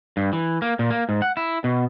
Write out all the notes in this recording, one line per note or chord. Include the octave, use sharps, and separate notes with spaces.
G2
E3
A#3
A#2
A#3
G#2
F#5
E4
B2